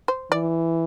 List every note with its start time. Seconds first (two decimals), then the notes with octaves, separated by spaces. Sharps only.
0.08 C5
0.32 E3 D5